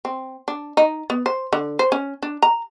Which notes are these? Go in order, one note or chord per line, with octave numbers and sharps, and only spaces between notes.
C4
D4
D#4
B3
C5
D3
C5
C#4
D4
A#5